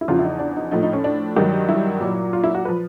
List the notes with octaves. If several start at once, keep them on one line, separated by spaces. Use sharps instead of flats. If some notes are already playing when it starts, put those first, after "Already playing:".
E4
E2 C#3 F3 F4
E4
D#4
D4
D#4
A2 F3 D#4
D#4
C#4
D4
G2 D#3 F#3
E4
A#2 F#3
F4
E4
F#4
F3 B4